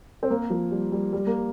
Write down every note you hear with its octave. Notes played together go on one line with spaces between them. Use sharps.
C4
A#3
F3
G3
G3
G3
A#3